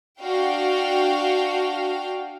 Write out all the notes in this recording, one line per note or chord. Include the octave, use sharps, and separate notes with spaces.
D4 F#4 F5 G5